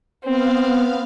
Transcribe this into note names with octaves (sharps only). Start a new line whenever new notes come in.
B3 C4 F5